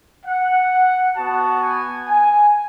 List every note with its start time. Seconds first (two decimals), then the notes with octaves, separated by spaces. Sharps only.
0.25 F#5
1.16 B3 F#4 A5
1.62 G#5
2.08 G#5